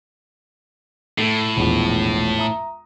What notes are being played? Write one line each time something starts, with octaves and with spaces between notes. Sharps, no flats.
A2 A3
E1 A#1 E2
E5 A#5 D#6